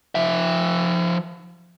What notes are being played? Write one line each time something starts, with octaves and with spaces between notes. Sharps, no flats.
F3 E5